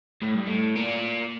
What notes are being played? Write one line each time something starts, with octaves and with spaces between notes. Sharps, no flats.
A2
G2
A2
A#2